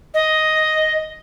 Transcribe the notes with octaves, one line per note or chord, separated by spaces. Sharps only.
D#5